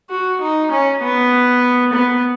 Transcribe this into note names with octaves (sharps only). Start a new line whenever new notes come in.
F#4
D#4
C#4
B3
B3